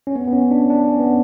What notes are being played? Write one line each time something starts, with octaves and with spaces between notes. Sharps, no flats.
C#4
B3
B3
C#4
D4
D4
C#4
B3